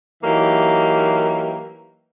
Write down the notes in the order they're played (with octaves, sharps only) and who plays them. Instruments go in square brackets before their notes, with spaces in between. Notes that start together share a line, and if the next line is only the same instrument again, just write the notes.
[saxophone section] E3 F#3 A#3 D#4 G4